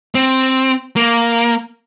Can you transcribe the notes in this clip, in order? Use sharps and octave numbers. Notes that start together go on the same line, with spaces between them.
C4
A#3